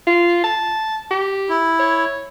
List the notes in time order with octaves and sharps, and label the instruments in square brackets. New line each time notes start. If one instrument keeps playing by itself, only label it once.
[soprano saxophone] F4
A5
G4
[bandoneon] E4
[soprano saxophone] C#5